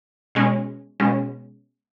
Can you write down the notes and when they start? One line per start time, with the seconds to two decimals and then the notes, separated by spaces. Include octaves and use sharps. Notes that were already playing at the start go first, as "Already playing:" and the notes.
0.35 B2 G#3 C#4
1.00 B2 G#3 C#4